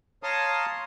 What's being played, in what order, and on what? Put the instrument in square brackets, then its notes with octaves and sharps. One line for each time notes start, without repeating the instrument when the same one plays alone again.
[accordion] C#5 F5 A5 A#5 C6 D#6